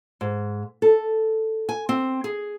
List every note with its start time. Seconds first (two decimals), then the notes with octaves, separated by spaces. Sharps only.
0.21 G#2
0.82 A4
1.69 G#5
1.89 C4
2.24 G#4